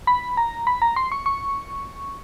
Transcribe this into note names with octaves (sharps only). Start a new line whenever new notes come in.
B5
A#5
B5
A#5
C6
C#6
C#6